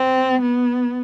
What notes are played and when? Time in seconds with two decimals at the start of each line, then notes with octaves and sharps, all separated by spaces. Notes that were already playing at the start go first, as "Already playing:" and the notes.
Already playing: C4
0.42 B3